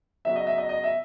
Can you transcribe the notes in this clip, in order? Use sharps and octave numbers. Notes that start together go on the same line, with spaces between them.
C#3 F#3 B3 E5
D#5
E5
D#5
D#5
E5